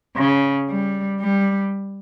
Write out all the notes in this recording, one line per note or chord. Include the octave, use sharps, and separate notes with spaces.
C#3
G3
G3